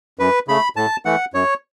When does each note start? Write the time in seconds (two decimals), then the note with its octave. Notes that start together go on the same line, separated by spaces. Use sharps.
0.19 F#2 B4
0.48 C#3 A3 B5
0.76 A2 A5
1.05 E3 A3 F#5
1.34 F#2 C#5